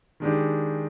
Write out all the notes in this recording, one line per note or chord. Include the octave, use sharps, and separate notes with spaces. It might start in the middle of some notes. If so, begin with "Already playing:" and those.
D#3 G#3 D4 G4